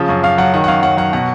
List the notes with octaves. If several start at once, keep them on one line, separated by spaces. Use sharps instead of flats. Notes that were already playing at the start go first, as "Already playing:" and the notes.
Already playing: C#3 F3
F#2
F#2 F5
F#3 F#5
D#3 F#5
F#5
F#2 F5
F#2 F#5
F#3 F#5
B2 F#5